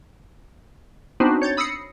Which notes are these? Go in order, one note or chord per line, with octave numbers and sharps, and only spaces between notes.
B3 C4 D4 D#4 F#4 C5
C#5 G6 A6
B5 D#6 E6 A#6 C7 C#7